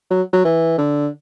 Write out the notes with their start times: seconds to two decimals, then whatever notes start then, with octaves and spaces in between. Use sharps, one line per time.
0.11 F#3
0.33 F#3
0.45 E3
0.78 D3